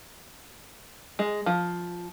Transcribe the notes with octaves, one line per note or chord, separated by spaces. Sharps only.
G#3
F3